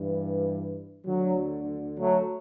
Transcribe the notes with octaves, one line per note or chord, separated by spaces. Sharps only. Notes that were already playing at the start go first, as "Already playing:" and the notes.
Already playing: G2 E3
D2 D3 F#3
F#3 A3